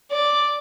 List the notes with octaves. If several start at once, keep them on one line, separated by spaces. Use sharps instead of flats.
D5